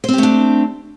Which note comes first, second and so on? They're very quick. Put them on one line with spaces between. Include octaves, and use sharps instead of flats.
C5 C4 G4 A3 D4